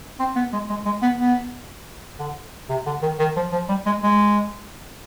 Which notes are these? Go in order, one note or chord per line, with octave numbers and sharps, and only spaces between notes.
C4
B3
G#3
G#3
G#3
B3
B3
D3
C3
D3
D#3
D#3
F3
F3
G3
G#3
G#3